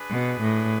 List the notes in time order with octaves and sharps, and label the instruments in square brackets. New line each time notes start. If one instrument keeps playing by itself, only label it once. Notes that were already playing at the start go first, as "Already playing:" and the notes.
Already playing: [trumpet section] D4 G#4 B4
[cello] B2
A2